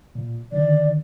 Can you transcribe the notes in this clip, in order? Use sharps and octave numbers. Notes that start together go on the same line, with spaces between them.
A#2
D3 D#3 D5